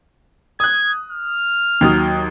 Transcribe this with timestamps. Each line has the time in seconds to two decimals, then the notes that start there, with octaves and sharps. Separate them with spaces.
0.60 D#6 F#6 G#6
1.11 F6
1.81 D#2 F#3 D#6